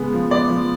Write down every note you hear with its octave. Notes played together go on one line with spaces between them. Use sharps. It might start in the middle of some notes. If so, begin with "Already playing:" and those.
Already playing: C#3 G#3 B3
F3
B3 D5
F3